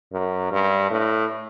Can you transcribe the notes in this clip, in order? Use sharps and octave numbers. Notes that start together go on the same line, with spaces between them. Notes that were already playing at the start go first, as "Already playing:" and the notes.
F#2
G2
A2